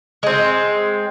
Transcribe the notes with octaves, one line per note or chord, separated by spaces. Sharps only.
G#3 C4